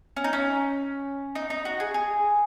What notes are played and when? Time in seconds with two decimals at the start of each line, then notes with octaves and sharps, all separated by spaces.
0.17 C#4
0.24 D#4
0.33 C#4
1.35 D#4
1.50 D#4
1.65 F#4
1.80 G#4
1.94 G#4